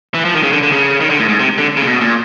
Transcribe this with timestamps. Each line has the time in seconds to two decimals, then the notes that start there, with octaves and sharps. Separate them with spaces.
0.14 E3
0.25 F3
0.34 D#3
0.43 C#3
0.52 D3
0.63 D3
0.72 C#3
1.01 D#3
1.10 D3
1.19 A2
1.29 G#2
1.39 C3
1.58 D3
1.77 C#3
1.82 A#2
1.87 B2
2.01 A#2